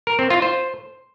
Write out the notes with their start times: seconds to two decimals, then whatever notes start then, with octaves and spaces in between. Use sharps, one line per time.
0.07 A#4
0.19 C4
0.30 F4
0.42 C5